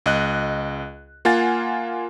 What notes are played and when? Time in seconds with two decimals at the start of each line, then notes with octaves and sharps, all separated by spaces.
0.06 C#2 D#5 F#6
1.25 A#3 F4 F#5 G#5 A6